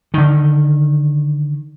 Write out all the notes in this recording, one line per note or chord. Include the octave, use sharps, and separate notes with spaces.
D3 D#3